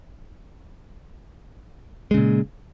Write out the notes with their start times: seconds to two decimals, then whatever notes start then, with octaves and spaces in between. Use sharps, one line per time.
2.11 G#3
2.14 C#3
2.17 A#2